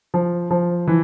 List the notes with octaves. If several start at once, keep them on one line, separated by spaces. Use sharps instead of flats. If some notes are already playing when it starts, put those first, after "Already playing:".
F3
F3
E3